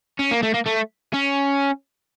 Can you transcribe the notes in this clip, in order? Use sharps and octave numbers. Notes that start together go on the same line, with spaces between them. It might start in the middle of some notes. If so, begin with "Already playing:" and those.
C#4
A#3
A3
A#3
A3
C#4